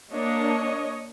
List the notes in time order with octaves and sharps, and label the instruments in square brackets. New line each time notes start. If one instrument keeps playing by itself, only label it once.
[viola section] A#3 D4 [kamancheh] C#5 D#5